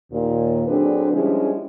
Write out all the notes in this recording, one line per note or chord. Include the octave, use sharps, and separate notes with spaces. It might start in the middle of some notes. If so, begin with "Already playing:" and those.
D#2 A#2
D3 F#3 C4 D4 G#4 B4
F3 G3 G#3 C#4 D4 E4